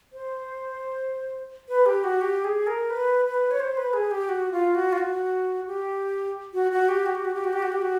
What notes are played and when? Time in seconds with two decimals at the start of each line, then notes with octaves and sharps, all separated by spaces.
0.13 C5
1.69 B4
1.86 G4
2.04 F#4
2.21 G4
2.44 G#4
2.67 A#4
2.90 B4
3.25 B4
3.51 C#5
3.60 C5
3.77 B4
3.93 G#4
4.11 G4
4.29 F#4
4.52 F4
4.75 F#4
4.92 F4
4.98 F#4
5.67 G4
6.54 F#4
6.71 F#4
6.89 G4
7.06 F#4
7.15 G4
7.25 F#4
7.34 G4
7.44 F#4
7.53 G4
7.62 F#4
7.72 G4
7.82 F#4